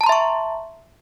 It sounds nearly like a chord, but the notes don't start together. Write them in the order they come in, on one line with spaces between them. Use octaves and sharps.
A5 A#5 C6 E5 C#6